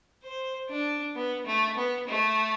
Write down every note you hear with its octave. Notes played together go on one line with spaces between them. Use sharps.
C5
D4
B3
A3
B3
A3